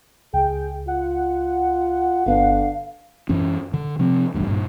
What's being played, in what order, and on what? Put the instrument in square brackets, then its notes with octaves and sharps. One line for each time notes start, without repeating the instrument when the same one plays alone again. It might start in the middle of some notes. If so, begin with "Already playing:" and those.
[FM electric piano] C#2 [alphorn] G#4 [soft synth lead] G5
[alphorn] F4 [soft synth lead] F#5
[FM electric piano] G1 B3 [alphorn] D3 [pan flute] F5
[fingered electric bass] F#2 E3 C#4
D3
C3 F3 C4
E1 A1 D2 G2
G2 A#2